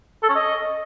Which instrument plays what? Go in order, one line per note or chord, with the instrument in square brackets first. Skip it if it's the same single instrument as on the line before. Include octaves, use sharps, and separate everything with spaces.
[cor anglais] A4
C#4
D#5